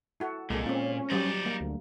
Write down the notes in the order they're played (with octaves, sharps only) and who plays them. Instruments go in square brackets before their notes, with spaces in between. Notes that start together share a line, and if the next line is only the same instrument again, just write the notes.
[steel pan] E4 F#4 A4
[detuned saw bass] C2 [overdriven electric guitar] A#2 [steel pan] G#3 A#3 A4
[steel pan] C4 F4 [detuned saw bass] C#4
[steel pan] F#3 G3 C5 [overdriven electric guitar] D#4 D5
[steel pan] A#3
[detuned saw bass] D2